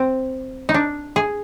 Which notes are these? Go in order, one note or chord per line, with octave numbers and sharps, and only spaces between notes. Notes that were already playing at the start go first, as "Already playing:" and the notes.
Already playing: C4
D#4
D4
G#4